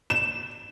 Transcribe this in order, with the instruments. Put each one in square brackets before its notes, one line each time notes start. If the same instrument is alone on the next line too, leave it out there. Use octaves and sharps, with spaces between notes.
[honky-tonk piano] E7